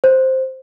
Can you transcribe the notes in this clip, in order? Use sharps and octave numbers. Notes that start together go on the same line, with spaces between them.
C5